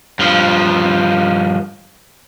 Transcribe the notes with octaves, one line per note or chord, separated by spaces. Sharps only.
G2 F3